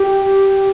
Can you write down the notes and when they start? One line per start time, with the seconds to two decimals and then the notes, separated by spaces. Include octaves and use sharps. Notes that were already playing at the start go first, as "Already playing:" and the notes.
Already playing: G4